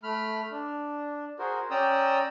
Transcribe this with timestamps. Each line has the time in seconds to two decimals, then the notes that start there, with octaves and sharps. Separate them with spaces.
0.03 A3 B5 F6
0.51 D4
1.39 F#4 G#4 A#4 C5
1.71 C#4 D5 G5 A#5 D#6 E6